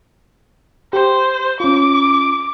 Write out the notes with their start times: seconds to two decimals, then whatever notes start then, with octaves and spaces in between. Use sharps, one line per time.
0.93 G4 C5
1.60 C#4 F4 D6